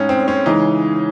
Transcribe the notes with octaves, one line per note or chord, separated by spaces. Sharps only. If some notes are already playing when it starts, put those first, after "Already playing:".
Already playing: A2 G#3 C#4 D#4
C4
C#4
C#3 E3 G#3 D#4